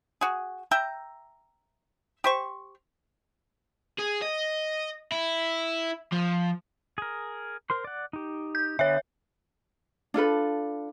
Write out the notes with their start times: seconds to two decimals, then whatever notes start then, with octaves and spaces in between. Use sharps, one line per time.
0.21 F#4 G#4
0.71 E5 G5 A#5
2.24 G4 C5 C#6
3.98 G#4
4.21 D#5
5.12 E4
6.13 F3
6.98 G#4 A#4
7.70 A#4 C5 C6
7.84 D5 F#5
8.13 D#4 G4
8.55 G6
8.79 D3 B3 C#5 E5 F#5
10.14 D4 F4 A4 B4